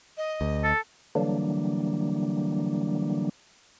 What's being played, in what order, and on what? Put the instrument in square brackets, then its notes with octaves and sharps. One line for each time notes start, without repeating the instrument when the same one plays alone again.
[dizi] D#5
[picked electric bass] D2
[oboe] A4
[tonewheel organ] D3 E3 F#3 G3 A#3 D4